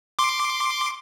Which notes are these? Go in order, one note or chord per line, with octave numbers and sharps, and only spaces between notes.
C6 D6